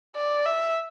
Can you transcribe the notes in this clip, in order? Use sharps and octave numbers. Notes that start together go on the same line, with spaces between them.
D5
E5